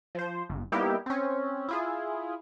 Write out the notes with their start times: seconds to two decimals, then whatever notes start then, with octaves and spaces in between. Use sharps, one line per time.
0.15 F3 C5
0.49 G1
0.72 G3 A#3 B3 D#4 E4 G4
1.06 C4 C#4
1.68 E4 F4 G#4